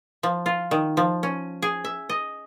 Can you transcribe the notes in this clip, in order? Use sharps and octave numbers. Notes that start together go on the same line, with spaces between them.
F3
F4
D#3
F3
C#4
G#4
E5
D#5